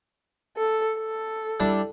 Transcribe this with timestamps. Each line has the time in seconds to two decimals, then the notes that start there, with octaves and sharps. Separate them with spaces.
0.57 A4
0.98 A4
1.60 G3 D4 E4